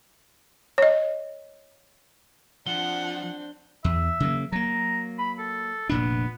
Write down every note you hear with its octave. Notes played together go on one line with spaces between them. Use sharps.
C#5 D#5
F3 C4 D4 F#5 G7
E2 E5
C#3 F#3 A#3
F#3 A#3 A#5
B5
A4
F1 A#2 B3 D4